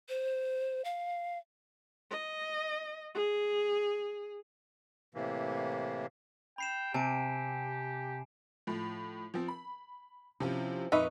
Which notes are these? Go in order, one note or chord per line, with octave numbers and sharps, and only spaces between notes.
C5
F5
D#5
G#4
A2 C3 E3 A#3
G5 B5 C7 E7
C3 G4 G#5 A5 D7
A2 F3
F3 C4
B5
C3 F3 C#4 E4
F2 A#2 D#4 B4 E5 C#6